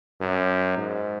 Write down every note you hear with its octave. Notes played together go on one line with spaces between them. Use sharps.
F#2
G#2